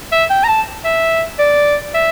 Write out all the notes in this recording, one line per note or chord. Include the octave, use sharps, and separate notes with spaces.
E5
G5
A#5
A5
E5
D5
E5